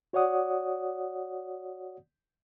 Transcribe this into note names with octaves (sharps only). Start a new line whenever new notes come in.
F#4 C#5 D5 F#5 D#6